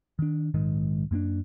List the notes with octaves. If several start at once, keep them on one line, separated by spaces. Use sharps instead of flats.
D#3 D4
A#1 G#2 D#3 G#3
F#2 A#3 C4 D4